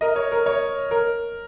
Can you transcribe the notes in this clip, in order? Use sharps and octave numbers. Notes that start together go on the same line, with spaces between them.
A#4 D#5
C#5
A#4
C#5
A#4